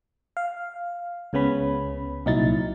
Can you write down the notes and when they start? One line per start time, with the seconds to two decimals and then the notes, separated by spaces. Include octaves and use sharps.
0.37 F5
1.33 C#2 C#3 B3 C#4 B5
2.26 C2 A#2 F#3 D#4 E4 A6